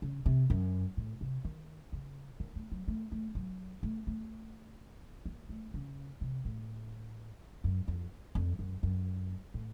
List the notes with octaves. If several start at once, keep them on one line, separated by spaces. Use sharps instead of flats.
C#3
C3
F#2
A2
C3
D#3
C#3
D#3
A3
F#3
A3
A3
F#3
A3
A3
A#3
A3
C#3
C3
A2
F#2
F2
F2
F#2
F#2
A2